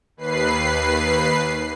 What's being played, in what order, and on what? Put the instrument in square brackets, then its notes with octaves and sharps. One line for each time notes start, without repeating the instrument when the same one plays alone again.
[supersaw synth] D#2 B4 C7